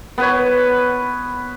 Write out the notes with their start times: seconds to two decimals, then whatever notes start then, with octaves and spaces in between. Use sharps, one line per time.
0.18 B3 B4 C#5